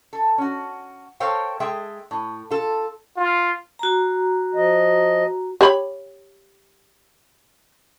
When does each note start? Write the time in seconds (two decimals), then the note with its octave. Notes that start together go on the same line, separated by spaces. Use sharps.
0.13 A4
0.38 C#4 F#4
1.20 A4 A#4 C5 C#5 F5 G5
1.60 G#3 G#4 A4 E5 G5
2.11 A2
2.50 F4 A4
3.17 F4
3.79 F#4 A#5
4.55 F3 D#5
5.61 G4 C#5 B5